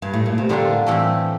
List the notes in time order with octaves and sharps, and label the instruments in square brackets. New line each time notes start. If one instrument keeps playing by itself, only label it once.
[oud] G2
A2
A#2
C3
[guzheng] A2 G3 A#3 D4 F4 [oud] D3
[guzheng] A2 E3 A3 C4 G4